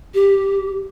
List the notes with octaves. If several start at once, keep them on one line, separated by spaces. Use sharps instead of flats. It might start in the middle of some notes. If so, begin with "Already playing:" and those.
G4